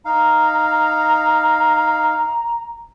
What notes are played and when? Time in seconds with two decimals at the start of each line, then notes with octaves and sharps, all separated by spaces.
0.05 D#4 F5 A#5